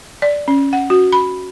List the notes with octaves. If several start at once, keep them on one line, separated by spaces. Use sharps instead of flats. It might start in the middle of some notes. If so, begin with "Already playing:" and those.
D5
C#4
F#5
F#4
B5